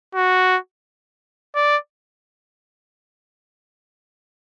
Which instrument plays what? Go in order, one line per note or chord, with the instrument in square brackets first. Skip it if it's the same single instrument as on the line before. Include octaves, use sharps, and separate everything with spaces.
[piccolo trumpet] F#4
D5